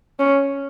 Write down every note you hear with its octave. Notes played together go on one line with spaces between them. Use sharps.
C#4